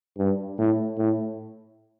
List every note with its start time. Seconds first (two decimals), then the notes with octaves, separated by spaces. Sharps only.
0.18 G2
0.58 A2
0.98 A2